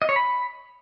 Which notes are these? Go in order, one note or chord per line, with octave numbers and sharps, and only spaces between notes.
D#5
C#5
B5